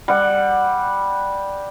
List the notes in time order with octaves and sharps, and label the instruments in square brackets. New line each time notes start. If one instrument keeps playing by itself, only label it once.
[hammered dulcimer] G3 F#5